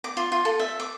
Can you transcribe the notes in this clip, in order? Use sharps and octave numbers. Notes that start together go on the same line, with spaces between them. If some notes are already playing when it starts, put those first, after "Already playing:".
D6
F4
F4
A4
E5
D6